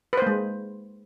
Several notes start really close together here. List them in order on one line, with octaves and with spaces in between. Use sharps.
B4 C5 A#3 G#3